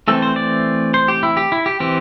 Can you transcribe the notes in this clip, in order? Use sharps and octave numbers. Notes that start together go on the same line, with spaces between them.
E3 A3 C4 A4
C5
D5
C5
G4
E4
G4
E4
G4
E3 C4 G4